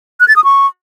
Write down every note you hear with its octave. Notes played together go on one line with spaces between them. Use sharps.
F#6
A6
D#6
C#6